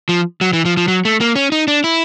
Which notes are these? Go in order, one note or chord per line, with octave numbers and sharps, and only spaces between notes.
F3
F#3
E3
F3
F3
F#3
A3
A#3
C#4
D#4
D4
E4